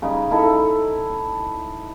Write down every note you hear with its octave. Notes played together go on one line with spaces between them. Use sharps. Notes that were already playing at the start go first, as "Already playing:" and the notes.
C#3 G3 D#4
D#4 E4 A4